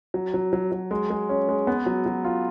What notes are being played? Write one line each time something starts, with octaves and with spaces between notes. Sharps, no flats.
F#3
F#3
F#3
F#3
G#3
G#3
C#4
G#3
B3
F#3
F#3
F4